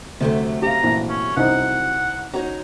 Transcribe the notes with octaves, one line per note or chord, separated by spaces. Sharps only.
D2 C3 F#3 A3
G4 F5 A#5
A#1 E3
C#4
C2 D#4 F#5
D#4 F#4 C#5 A#5